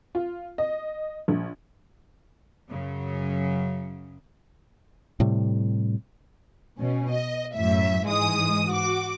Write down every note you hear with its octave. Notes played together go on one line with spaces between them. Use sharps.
F4
D#5
A#1
F#2 C#3 F#3
A2 C3 G3
B2 C#4
D#5
F#2 A2 E5
G#2 E3 G#3 D#6
F#4 D6